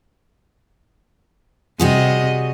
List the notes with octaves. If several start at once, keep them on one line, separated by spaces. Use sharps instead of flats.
C3 G3 F#4 G#4 D#5